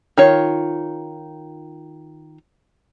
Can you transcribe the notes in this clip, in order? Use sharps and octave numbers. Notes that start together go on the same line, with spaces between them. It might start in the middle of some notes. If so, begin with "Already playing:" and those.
D#3 F4 C#5